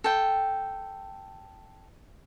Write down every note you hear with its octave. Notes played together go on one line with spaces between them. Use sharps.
A4 G5